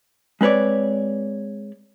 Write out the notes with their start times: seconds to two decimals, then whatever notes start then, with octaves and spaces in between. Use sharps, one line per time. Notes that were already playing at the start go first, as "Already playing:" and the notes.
0.41 G#3 C4 B4 C#5 D5